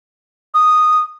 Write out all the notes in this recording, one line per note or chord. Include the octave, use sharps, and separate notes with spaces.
D#6